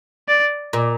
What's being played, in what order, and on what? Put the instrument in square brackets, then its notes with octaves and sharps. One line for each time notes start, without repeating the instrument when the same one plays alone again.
[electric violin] D5
[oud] A#2